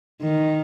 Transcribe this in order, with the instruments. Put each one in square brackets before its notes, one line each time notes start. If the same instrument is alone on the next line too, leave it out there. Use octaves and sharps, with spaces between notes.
[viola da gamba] D#3